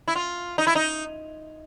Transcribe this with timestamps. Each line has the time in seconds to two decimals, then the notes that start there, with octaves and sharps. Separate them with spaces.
0.08 E4
0.15 F4
0.58 D#4
0.67 E4
0.75 D#4